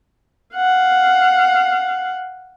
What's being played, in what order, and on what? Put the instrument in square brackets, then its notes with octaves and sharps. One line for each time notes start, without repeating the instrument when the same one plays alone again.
[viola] F5 F#5